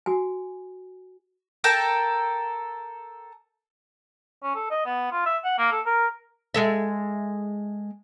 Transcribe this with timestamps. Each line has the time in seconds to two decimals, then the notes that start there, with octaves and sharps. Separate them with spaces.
0.06 F#4 G#5
1.64 A4 A#4 G5 A5
4.43 C#4
4.55 A4
4.71 D#5
4.86 B3
5.12 F4
5.26 E5
5.44 F#5
5.59 A#3
5.72 A4
5.86 A#4
6.54 G#3 A4 E5